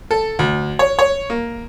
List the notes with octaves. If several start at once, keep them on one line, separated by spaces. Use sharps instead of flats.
A4
D2
C#5
C#5
A#3